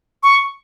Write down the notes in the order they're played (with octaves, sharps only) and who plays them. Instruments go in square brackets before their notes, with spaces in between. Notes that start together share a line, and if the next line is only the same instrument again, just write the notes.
[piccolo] C#6